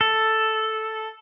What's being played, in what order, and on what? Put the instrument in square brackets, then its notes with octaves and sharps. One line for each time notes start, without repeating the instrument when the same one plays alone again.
[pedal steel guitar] A4